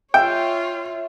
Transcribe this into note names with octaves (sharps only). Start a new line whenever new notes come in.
F4 C#5 E5 G5